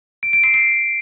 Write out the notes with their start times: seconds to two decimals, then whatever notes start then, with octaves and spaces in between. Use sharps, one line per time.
0.23 D7
0.33 D7
0.44 C7
0.54 C7